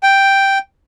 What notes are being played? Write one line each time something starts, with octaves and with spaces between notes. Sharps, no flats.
G5